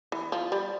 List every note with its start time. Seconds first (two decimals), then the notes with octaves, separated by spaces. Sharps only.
0.12 E3
0.32 F3
0.52 G3